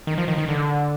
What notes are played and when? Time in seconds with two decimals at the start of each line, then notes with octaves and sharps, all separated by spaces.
0.07 D#3
0.18 F3
0.28 D#3
0.38 D#3
0.48 D3